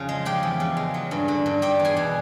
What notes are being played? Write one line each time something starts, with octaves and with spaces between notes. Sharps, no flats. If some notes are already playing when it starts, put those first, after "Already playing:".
Already playing: F2 C#3 G#4
G#3
F3 G4 G5
E2
C#3
G#3
F#3
G2
D3
G2
G3 G4 G5
E2
G#4 G#5
B2